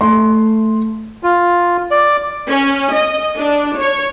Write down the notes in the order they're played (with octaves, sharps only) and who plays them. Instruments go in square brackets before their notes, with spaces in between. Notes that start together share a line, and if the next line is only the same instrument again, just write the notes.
[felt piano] A3 C6
[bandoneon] F4
D5
[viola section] C#4
D#5
D4
C#5